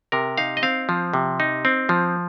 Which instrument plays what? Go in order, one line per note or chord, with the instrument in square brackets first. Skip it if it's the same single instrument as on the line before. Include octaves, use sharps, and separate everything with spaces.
[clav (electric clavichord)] C3 A#4
D#4 F5
D#5
C4 F5
F3
C3
D#4
C4
F3